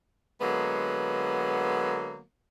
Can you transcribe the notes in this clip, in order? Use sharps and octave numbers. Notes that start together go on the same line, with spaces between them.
D3 F#3 G#3 A#3 B3